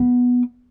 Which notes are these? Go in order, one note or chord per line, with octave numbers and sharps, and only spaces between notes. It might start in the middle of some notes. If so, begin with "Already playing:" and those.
Already playing: B3